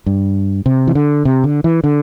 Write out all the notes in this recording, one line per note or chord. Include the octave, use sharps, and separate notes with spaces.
G2
C3
E3
D3
C3
D3
E3
D3